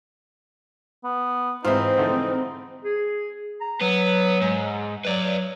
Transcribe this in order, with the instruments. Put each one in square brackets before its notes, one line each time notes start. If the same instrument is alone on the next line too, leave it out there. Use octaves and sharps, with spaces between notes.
[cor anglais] B3
[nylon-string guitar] G#2 E3 [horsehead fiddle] C4 [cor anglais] D#4 [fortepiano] F4 C5 E5
[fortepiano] D3 F3 A3
[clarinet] G#4
A#5
[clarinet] F#3 [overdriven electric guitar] B3
[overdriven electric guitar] G#2
[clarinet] F#3 [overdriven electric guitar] B4 D5